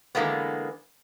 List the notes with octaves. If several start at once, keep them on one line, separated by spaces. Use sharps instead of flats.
D3 E3 F3 G#3 A#3 B3